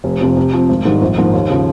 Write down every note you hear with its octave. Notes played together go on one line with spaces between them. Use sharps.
F1
F2 C3 F3
C3
F3 C4
G#1
G#2 D#3 G3
A#1
G#2 F3 A#3
D#2
C#3 F3